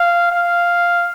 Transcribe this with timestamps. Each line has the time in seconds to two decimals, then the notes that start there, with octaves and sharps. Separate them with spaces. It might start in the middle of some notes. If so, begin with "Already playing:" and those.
Already playing: F5
0.31 F5